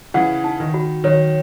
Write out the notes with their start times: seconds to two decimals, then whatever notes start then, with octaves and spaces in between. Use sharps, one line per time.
0.14 C#3 E3 F#5
0.44 D#4
0.60 D#3
0.74 F#4
1.04 D#3 F#3 C#5